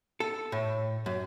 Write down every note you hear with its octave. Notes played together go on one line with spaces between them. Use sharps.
A4
A2
F#2